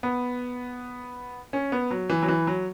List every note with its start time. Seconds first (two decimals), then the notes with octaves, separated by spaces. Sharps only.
0.03 B3
1.53 C#4
1.72 B3
1.91 F#3
2.10 E3
2.22 F#3
2.28 E3
2.47 F#3